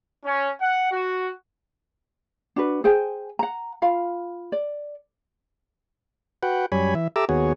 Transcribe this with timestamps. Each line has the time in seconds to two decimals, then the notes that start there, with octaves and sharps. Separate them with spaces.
0.24 C#4
0.59 F#5
0.91 F#4
2.56 D4 F#4 B4
2.84 G#4 C5 G5 G#5
3.39 F#5 A#5
3.82 F4 F5 B5
4.52 D5
6.43 F#4 B4 F#5 G5
6.72 F#2 G3 C#5 G#5 B5
6.95 E3 E5
7.16 G4 A4 E5 A#5 D6 E6
7.29 D#2 B3 F#4 G#4 C#5